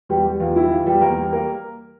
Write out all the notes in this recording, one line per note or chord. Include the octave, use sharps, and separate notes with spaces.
E2 G3 G4
G3
E2 F4
G3 E4
E3 F4
E2 G3 G4
E2 A#3 A#4
G3
A#3 A#4